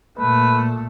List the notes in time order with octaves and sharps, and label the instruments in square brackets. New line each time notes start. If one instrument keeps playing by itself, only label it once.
[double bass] A#2 A3 [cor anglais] B4